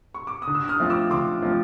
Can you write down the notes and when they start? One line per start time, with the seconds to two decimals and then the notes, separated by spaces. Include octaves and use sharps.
0.14 C#6
0.27 D6
0.42 D#6
0.47 D3
0.55 E6
0.68 D#6 F6
0.80 F3 A3 C4 F4
0.90 D6 E6
1.10 D3 C6 D6
1.42 F3 A3 C4 F4